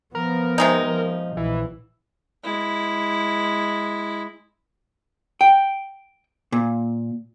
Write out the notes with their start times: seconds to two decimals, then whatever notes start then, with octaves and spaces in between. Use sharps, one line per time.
0.15 F3 B3 A#4
0.58 C3 G#3 D#4
0.87 F3
1.37 A#1 E3 E4
2.44 G#3 E4
5.41 G5
6.52 A#2